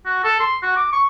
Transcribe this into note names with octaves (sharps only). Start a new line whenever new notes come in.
F#4
A4
C6
F#4
D6
C#6